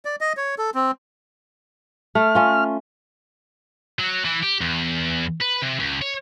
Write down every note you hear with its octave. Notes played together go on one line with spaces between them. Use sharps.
D5
D#5
C#5
A4
C4
A3 F6
C#4 F4
F#3
E3
G4
E2
B4
C3
C#2
C#5